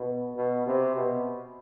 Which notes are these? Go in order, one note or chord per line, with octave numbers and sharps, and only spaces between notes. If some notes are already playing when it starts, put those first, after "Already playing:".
Already playing: B2
B2
C3
B2